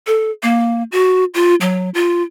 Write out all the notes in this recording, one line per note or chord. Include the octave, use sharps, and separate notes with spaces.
A4
A#3
F#4
F4
F#3
F4